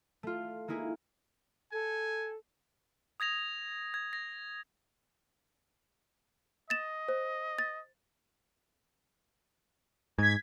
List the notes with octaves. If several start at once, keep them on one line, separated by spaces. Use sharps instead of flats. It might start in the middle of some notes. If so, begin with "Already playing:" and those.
A3 F4
G#3 A#3 D#4 E4 G#4
A4 G#5
D#6 G#6 A#6 F7
G#6
A#6
D#5 A6 E7
C5
A6
G#2 G#6 B6